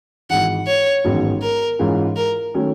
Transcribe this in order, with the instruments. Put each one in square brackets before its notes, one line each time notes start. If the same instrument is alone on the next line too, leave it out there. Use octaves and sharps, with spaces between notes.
[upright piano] G#1 G#2 E3 [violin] F#5
[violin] C#5
[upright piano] A1 G#2 D#3 F#3 B3
[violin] A#4
[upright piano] G#2 E3 G#3 C#4 F4
[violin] A#4
[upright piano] D#3 F#3 A3 C#4